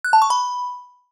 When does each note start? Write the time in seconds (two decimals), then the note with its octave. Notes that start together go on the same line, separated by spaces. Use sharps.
0.04 F#6
0.13 A5
0.22 C#6
0.30 B5